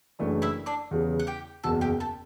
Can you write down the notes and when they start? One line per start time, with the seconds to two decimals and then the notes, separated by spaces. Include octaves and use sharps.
0.19 F#1 F#2 E3 A3 D4
0.42 E4 E5
0.66 D4 D5
0.91 E2 C#3 E3 G3
1.19 F#5
1.27 G4 G5
1.63 F#1 E2 B2 A4 A5
1.81 G4 G5
2.00 A4 A5